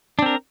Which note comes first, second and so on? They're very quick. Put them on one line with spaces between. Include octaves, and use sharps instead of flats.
D4 C4 A#4